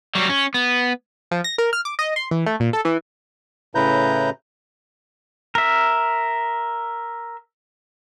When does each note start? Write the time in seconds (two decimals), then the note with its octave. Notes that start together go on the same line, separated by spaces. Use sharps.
0.15 F#3 G3
0.29 C#4
0.54 B3
1.31 F3
1.44 A#6
1.58 A#4
1.73 F6
1.85 D6
1.99 D#5
2.16 C6
2.31 E3
2.46 A3
2.60 A#2
2.73 A4
2.85 E3
3.75 A2 C#3 E4 B4 A#5 G6
5.55 A#4 E5